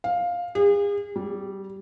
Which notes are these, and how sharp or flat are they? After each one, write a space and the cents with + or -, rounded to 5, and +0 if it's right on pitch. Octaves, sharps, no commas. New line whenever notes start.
F5 +10
G#4 -40
G3 -15